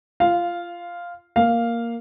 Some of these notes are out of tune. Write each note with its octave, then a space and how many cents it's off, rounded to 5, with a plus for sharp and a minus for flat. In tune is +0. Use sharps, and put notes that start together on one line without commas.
F4 -20 F5 +0
A#3 +0 F5 +0